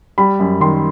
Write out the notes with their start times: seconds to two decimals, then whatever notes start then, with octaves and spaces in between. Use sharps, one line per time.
0.18 G3 B5
0.40 F#2
0.61 D#3 C6